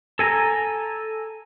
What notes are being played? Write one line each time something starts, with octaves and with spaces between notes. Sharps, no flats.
A4 G#5 A#5